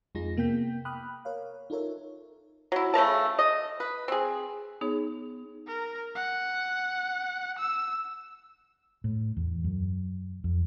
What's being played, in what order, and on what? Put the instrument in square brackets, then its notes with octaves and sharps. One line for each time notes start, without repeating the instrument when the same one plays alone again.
[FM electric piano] F2 G#3 D#4 F4 G#4 A#6
C3 A#3 B3 G5 G6 B6
G5 B5 D6 D#6 F6 F#6
A#4 C#5 F5
D#4 F4 A4 A#4 C#5 E5
[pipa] F#3 E4
C#3 A3 A#4 A5
D#5
B4
C4 G#4
[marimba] B3 D#4 G#4 C#5
[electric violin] A#4
F#5
E6
[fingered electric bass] A2
E2
F#2
F2